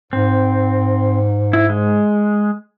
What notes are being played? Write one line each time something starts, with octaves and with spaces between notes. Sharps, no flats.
G#2 C4
E4
G#3